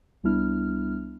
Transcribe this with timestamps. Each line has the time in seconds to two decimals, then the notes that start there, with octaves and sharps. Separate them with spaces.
0.23 C2 G3 B3 D4 E4 F6